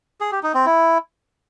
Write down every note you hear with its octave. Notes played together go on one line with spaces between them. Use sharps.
G#4
G4
D#4
C4
E4